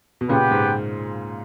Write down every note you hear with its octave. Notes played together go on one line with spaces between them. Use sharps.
B2
A#2 C#3 B3 G4 B4 G5
G#2